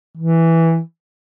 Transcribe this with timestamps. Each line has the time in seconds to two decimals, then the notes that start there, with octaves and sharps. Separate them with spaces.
0.17 E3